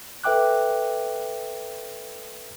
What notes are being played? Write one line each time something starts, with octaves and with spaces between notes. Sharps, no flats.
A4 B4 E5 G5 D6 F#6